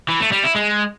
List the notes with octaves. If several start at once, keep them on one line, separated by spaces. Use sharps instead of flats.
E3
A3
G3
E4
G#3